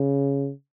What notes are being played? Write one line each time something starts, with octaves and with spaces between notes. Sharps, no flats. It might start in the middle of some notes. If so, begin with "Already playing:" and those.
Already playing: C#3